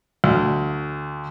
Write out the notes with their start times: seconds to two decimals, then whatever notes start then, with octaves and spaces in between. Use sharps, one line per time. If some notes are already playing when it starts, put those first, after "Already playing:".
0.24 D2